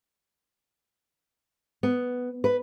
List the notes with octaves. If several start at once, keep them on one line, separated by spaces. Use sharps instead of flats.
B3
B4